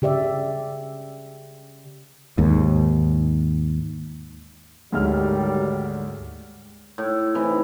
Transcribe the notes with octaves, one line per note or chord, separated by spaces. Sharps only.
C#3 G4 D5 E5
D#2 G#2
D2 G#2 D#3 F#3 G3 F6
A2
C3 E3 D#4